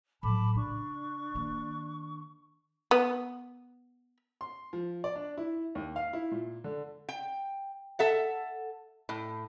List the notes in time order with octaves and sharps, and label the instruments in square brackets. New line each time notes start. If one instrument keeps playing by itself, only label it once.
[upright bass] A2 F#3 [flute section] A5 B5 D6
[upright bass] C#3 [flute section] D4 C#6
[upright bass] D#3 A#3
[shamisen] B3
[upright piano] C6
F3
D5
D4
E4
D#2
F5
E4
A#2
D3
[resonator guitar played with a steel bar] G5
A4 E5 F#5
A2